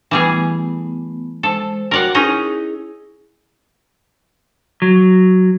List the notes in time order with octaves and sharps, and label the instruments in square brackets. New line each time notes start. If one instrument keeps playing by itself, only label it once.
[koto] E3 G3 G#4 [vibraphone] A3 B3
[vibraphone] G#3 C5 [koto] A4
[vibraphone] F#4 C#5 G5 [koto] A#4 D5 F#5
[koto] C#4 D#4 D#5 [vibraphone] E4 G#4
[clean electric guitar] F#3